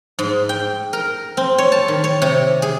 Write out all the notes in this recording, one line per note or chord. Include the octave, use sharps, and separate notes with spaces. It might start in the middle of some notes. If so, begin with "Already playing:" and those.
G#2
G5
A#4
C4
C#5
A5
D#3
C#5
C3
G#4